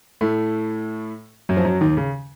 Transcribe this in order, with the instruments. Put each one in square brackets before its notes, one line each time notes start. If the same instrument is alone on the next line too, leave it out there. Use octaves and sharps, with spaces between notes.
[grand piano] A2 A3
F#2 F#3
F3
F#2 F#3
D#2 D#3
C#3